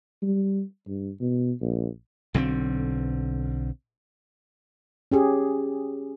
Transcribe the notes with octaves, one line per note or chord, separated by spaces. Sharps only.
G3
G2
B2
A#1
B1 D3 G3 C4
C#4 G4 G#4